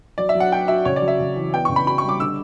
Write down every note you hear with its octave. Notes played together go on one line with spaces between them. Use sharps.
F#3 D5
E5
F#3
F#5
F#4 G5
F#4 E5
C#3 C#5
D5
F#3
E5
C#3
E3
B3 G5
C#3 C#6
B5
F#4 B5
C#6
G3 D6
D3 E6